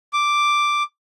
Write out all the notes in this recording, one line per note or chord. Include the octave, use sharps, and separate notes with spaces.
D6